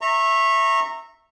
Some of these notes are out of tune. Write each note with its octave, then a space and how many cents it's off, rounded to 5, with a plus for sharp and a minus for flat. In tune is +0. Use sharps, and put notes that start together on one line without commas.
E5 +0 A#5 -20 C#6 -30